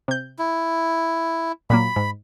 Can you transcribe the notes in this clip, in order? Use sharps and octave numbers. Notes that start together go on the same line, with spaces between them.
C3 G6
E4
A#2 F#3 A#3 B5
G#2